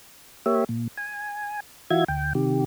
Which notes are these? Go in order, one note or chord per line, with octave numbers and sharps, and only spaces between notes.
A#3 G4 C#5 E5
A#2
G#5
E3 F4 F#4 E5 G#6
D2 G5
C3 D#3 G4